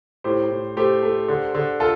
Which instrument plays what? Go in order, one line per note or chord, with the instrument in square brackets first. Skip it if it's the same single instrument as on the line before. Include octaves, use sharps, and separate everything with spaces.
[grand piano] A2 G4 C5
A2
A3 G4 C5
A3
D3
D3
F4 A4